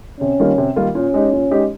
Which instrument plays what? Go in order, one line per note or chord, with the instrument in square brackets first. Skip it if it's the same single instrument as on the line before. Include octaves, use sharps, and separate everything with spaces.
[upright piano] C3 [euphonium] C#4
[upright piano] D#3 G3 A#3 F4
C3
D#3 G3 A#3 F4
[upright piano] A#2 [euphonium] C#4
[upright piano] G#3 D#4 G4
A#2
G#3 D#4 G4